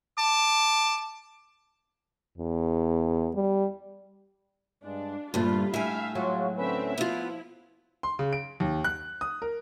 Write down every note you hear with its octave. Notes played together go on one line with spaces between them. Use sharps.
A5 D6
E2
G3
G2 G#3 D4
D2 G2 A#2 A3 F4 B5
A2 E4 E5 F5 G#5
F#3 G#3 F4 F#4
D3 C4 C#4 B4 E5
F3 B3 E4 F4
C6
C#3
D7
D#2
F#6
D#6
A#4